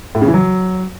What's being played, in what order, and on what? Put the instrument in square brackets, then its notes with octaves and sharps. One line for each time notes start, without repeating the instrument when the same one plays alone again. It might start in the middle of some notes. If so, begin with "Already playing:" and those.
[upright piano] A2
C#3
E3
F#3